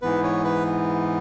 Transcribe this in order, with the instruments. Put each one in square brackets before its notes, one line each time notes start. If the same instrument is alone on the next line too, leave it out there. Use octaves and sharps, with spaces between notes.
[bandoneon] G#2 E3 B3 B4
C#5
B4